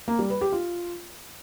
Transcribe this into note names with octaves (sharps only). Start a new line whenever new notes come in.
A#3
G3
B4
G4
F4